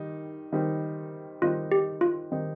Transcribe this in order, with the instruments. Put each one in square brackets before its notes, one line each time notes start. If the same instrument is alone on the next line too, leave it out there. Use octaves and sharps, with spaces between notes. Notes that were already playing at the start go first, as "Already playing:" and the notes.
Already playing: [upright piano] D#3 G3 D#4
D#3 G3 C4 D#4
[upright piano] D#3 G3 C4 D#4 [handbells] F4
[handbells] G4
F4
[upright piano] D#3 G3 C4 D#4